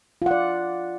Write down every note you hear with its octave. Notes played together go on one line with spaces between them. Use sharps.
F4 D5 F#5